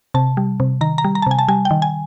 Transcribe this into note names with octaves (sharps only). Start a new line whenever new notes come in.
C3 A5
G3
C3
D#3 A#5
A#5
G3
A#5
A5
C3 G#5
A5
G3 G#5
G5
D#3
G#5